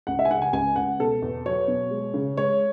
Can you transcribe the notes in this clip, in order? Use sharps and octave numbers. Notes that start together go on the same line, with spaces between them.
C#2 F#5
E5
G#5
C#3 F#5
G#5
C#2 G#5
C#2 F#5
B2 A4
E2
F#3 C#5
B2
G#3
C#3
G#3 C#5